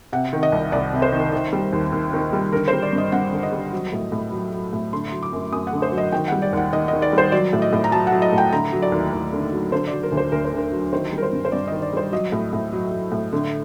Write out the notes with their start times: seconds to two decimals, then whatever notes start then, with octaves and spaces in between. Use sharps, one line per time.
0.13 C3 F#5
0.33 D#3
0.43 D#5
0.52 C2
0.72 C2 D5
0.93 C3
1.02 C5
1.12 D#3
1.33 D#3
1.53 G3
1.73 D#2
1.92 D#2
2.13 D#3
2.33 G3
2.52 D3 A#4
2.68 C5
2.73 G3
2.83 D5
2.93 G2
2.98 D#5
3.12 G2 F#5
3.33 D3
3.43 D#5
3.52 G3
3.72 F#3
3.93 A2
4.12 A2
4.32 F#3
4.53 F#3
4.73 A2
4.93 D3 C6
5.12 F#3
5.23 D6
5.33 F#2
5.52 F#2 D#6
5.67 F#5
5.72 D3
5.82 C5
5.92 F#3
5.98 D#5
6.12 D#3 G5
6.28 G3 F#5
6.42 D5
6.53 D#2 F#5
6.73 D#2 D#5
6.88 D#3 D#5
7.02 D5
7.13 G3
7.18 C5
7.32 F#3 D5
7.53 A2
7.62 D#5
7.73 A2
7.84 A#5
7.92 F#3 A5
8.07 F#5
8.12 F#3
8.22 D#5
8.33 A2
8.38 G5
8.52 D3 A#5
8.73 F#3
8.82 D5
8.92 D#2
9.13 D#2
9.33 D3
9.52 F#3
9.72 D3 C5
9.87 F#3 D5
10.03 A#4
10.12 D2
10.17 C5
10.32 D2 A#4
10.44 C5
10.53 D3
10.58 A#4
10.72 F#3
10.92 D#3 C5
11.13 G3
11.18 A#4
11.23 C5
11.32 G2
11.45 C5
11.52 G2 D5
11.67 D#3 D#5
11.82 D5
11.93 G3 C5
12.12 F#3 D#5
12.32 A2
12.53 A2
12.73 F#3
12.92 F#3
13.12 A2
13.33 D3